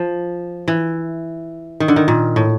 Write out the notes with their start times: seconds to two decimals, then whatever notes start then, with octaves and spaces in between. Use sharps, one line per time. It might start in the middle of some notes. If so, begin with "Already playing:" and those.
Already playing: F3
0.68 E3
1.80 D#3
1.88 D3
1.96 D#3
2.08 A#2
2.36 A2